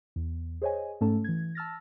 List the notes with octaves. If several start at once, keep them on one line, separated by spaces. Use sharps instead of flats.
E2
G#4 C5 C#5 D#5 G#5
G#2 A3 C#4 A4 A5
E3 G#6
A5 E6 F6 A6 A#6